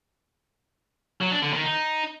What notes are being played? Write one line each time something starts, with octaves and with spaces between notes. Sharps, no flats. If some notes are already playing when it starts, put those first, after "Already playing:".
F#3
D4
D3
D#3
D#4